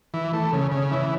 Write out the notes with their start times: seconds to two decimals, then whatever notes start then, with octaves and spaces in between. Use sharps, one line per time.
0.14 E3
0.33 A3
0.53 C#3
0.71 C#3
0.91 E3